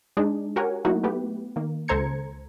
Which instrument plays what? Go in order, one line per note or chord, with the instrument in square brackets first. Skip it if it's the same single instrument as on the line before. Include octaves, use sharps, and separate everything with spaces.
[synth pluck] G#3 D4 D#4 G#4
F#4 G4 A#4 C#5 F#5 G#5
F#3 A3 A#3 D#4 E4 F#4
A3 B3 G4 B4
D#3 A#3
C#2 A4 C5 A#5 G#6 C#7